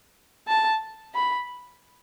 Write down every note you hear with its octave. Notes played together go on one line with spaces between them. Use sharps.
A5
B5